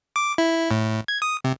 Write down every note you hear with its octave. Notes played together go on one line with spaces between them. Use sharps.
D6
E4
A2
G#6
D#6
C3